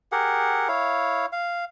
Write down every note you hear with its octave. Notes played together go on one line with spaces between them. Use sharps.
G4 G#4 A#4 F#5
E4 C#5 F5
F5